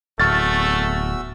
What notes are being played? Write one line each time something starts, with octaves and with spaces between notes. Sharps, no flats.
D1 E2 A3 F#4 C#6 E6 F6 A6